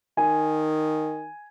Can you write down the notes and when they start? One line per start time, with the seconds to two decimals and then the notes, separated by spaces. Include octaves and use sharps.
0.17 D#3 G#5